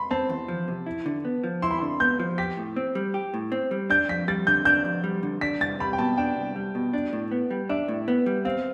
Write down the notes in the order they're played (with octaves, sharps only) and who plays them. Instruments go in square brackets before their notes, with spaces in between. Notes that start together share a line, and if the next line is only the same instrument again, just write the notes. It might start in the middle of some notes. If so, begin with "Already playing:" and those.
Already playing: [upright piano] B5 C6
[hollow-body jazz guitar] C4 [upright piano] A5
[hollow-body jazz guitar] E2
F3
C3
E4
D3
B3
F3
[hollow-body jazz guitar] E4 [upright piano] C6
[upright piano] B5
[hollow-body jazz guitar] D3 [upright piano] C6
[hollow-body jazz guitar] B3 [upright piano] G6
[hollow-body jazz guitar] F3
[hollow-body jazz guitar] G4 [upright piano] B6
[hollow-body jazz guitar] A2
C4
G3
G4
A2
C4
G3
[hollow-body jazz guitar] D4 [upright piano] G6
[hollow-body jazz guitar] F2 [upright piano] B6
[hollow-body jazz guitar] G3 [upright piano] A6
[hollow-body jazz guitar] D3 [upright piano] G6
[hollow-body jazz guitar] D4 [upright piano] G6
[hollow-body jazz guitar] F2
G3
D3
[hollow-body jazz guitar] D4 [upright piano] B6
[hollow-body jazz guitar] C2 [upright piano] A6
[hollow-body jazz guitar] G3 [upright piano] B5
[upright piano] G5
[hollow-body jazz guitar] B2 [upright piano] A5
[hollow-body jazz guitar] D4 [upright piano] G5
[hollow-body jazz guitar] C2
G3
B2
D4
A2
B3
G3
[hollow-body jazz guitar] D4 [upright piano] E5
[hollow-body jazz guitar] A2
B3
G3
[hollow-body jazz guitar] C4 [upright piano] F5